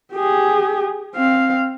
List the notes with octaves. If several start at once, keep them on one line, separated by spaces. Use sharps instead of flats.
G4 G#4
C4 F5